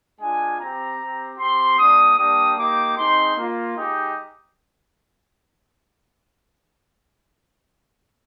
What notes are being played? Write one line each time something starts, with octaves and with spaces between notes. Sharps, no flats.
G#3 D4 F4 G#5
C4 G4 A#5
C4 G4
C4 G4 C6
G3 A#3 D4 D#6
G3 A#3 D4 G4 D#6
A#3 D#4 G4 D6
G#3 C4 D#4 C6
A#3 F4
G#3 D#4 G4